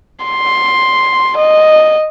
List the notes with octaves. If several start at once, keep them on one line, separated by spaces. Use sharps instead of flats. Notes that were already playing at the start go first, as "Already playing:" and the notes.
C6
D#5